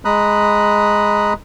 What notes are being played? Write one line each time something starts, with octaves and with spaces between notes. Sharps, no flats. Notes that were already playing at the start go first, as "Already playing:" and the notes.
G#3 A#5 B5 D#6 F#6